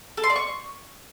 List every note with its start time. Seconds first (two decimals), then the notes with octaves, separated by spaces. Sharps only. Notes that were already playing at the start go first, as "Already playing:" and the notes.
0.17 A4
0.23 C6
0.30 D5
0.36 C#6